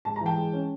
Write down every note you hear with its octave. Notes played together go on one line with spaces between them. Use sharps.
G#2 A5
E3 A#5
G5 A5
G#3
C#4